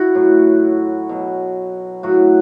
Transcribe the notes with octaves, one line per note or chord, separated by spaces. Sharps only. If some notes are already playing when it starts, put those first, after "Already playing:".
Already playing: E4 F#4
A2 F#3
B2 F#3
A2 F#3 F#4